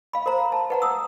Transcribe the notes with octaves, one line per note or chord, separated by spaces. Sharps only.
F5 B5
A#4 C5 A#5
A5
B4 F#5 A#5
D#6 E6